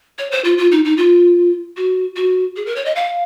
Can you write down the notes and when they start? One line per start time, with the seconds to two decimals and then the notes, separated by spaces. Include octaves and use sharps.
0.18 C#5
0.31 C5
0.44 F4
0.58 F4
0.71 D#4
0.85 D#4
0.97 F4
1.77 F#4
2.16 F#4
2.56 G#4
2.66 A#4
2.76 C#5
2.85 D#5
2.96 F5